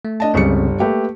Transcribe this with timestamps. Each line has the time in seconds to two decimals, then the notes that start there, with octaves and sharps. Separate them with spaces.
0.05 A3
0.20 D4 D#5 A5
0.34 G1 C#2 C#3 G3 C4 C#7
0.80 A3 A#3 G4 B4